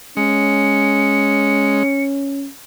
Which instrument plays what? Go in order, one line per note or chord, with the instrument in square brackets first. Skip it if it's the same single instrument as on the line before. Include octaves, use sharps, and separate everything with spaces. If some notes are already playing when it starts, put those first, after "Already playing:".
[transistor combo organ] G#3 [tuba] C#4 [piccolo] C#7